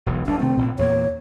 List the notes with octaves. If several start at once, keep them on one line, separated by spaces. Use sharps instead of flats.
E1 B1 E3
F#1 F#2 D4
C3 D#3 A3 C4
A1 A#2
E2 A#2 A#3 C#5